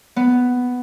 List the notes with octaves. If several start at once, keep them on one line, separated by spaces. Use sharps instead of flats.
B3